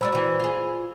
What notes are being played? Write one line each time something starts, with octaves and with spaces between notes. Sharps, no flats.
F#3 G#3 D4 C5 B5 E6
E3 F#4
F4 G#4